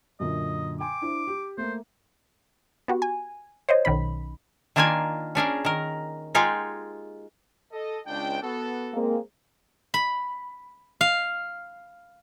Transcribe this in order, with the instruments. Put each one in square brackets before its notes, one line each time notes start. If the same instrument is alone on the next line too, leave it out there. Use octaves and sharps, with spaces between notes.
[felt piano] F#2 A#2 D3 [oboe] D#5
[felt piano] G5 G#5 C6 [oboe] D6
[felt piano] D4 E4 C5
G4
[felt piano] A3 A#3 [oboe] C5
[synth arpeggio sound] B3 F#4 G4
G#5
C5 C#5 D#5
B1 D#3 C#4 B5
[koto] D#3 A#3 D4 F4 A#4 G#5
C#4 D4 G#4 A#4
D#3 A#4
G#3 D#4 F4 G4 G#4 F5
[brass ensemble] A4 D#5
C#2 D4 G5
B3 F#4 A4
[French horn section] G#3 A#3 C4
[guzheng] B5
F5